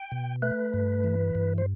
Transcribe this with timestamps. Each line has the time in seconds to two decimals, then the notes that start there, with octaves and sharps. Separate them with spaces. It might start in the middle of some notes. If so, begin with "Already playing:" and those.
Already playing: G5
0.12 B2
0.42 A3 B4
0.74 G2
1.04 E3
1.35 G2
1.58 C5